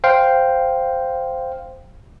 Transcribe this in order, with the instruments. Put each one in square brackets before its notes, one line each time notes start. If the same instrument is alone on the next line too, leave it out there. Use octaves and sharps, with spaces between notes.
[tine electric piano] C5 F5 G5